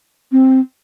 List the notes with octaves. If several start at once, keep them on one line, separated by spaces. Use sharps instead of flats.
C4